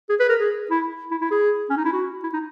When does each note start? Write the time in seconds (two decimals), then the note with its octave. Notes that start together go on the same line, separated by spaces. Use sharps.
0.09 G#4
0.19 B4
0.29 A#4
0.40 G#4
0.71 E4
1.11 E4
1.21 E4
1.31 G#4
1.70 C#4
1.77 D#4
1.85 E4
1.93 F#4
2.23 E4
2.33 D#4